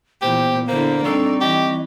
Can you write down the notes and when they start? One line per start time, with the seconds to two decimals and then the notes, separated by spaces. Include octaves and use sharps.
0.22 A#2 E3 B3 G4 C5
0.68 D3 A#3 E4 C5
1.04 G3 C4 D4 D#4 A4 D5 C#6
1.41 E3 G4 D#5